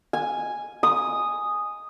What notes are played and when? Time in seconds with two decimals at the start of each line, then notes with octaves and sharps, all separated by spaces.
0.13 G#5
0.83 D#6